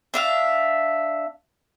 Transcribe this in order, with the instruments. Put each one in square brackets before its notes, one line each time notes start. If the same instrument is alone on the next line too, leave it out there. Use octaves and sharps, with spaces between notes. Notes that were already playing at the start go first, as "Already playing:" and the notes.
[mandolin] D4 E5 F5